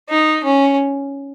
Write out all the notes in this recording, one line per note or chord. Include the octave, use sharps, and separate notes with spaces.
D#4
C#4